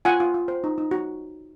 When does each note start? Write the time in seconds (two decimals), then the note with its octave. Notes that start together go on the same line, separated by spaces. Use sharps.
0.05 F4 F#5 G#5
0.20 F4
0.34 F4
0.48 C5
0.64 D#4
0.78 D#4
0.91 F#4